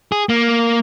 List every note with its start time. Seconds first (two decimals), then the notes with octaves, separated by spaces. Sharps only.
0.12 G#4
0.29 A#3